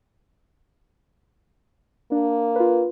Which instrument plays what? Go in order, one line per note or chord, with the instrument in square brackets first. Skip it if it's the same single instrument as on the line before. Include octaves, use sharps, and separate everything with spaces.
[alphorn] A#3 [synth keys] D4
[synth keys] F4 B4